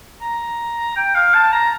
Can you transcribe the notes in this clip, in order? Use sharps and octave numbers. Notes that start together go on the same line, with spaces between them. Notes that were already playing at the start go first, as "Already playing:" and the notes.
A#5
G5
F5
A5
A#5